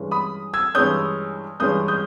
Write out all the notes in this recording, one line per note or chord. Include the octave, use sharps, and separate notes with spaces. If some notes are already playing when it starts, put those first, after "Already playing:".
Already playing: G2 E3 G#3 C#4
B5 D#6
E6 G#6
G2 E3 G#3 C#4 D#6 G6
G2 E3 G#3 C#4 D#6 G6
D#6 G6